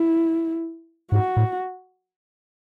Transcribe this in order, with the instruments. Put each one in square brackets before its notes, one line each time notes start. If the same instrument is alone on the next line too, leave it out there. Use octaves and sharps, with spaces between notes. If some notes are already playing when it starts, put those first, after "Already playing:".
Already playing: [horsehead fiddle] E4
[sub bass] G#2 [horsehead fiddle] F#4
[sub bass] A2